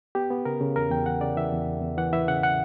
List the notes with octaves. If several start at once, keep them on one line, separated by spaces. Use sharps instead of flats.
B3 G4
B3
C#3 A#4
C#3
E2 A#4
E2 G5
E3 F#5
C#3 D5
E3 E5
E2
E2
E2
E3 F#5
E3 E5
C#3 F#5
F#5